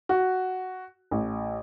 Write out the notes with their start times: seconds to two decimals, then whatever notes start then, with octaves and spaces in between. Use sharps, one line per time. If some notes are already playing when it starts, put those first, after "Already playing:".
0.09 F#4
1.11 A1